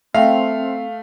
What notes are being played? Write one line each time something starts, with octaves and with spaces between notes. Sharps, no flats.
A3 C4 E5 F5 G5